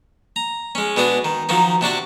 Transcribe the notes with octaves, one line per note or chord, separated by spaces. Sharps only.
A#5
G#3 C#4
B2 G#3 D4 G#4
D#3
D#3 F3 F#3 D#4
C3 D4 F#4 D5